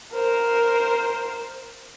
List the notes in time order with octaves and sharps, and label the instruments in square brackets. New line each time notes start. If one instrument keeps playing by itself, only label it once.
[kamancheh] A#4 C5